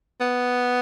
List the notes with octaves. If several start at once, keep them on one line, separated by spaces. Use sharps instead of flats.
B3